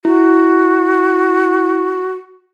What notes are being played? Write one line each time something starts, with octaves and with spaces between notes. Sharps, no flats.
E4 F#4